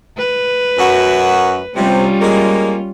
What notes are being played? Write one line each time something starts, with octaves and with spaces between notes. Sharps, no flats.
B4
F#2 F#4
C3 G3 C#4 F4
G#3 A#3